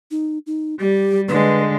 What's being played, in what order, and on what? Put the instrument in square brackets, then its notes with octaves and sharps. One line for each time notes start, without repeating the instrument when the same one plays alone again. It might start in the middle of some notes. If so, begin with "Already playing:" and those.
[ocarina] D#4
D#4
[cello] G3 [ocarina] G4
[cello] D3 G#3 [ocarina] B4